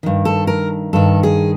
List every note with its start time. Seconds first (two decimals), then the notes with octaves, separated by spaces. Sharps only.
0.03 G2 D#3
0.25 A4
0.47 A#4
0.93 G2 D#3 A4
1.23 G#4